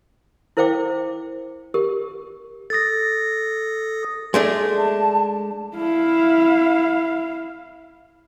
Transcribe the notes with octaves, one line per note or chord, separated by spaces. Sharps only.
E4 A#4 C5 F5 G5 D6
G4 A#4
A4 D#6 A6 A#6
G#3 A3 D4
A5
E4 F5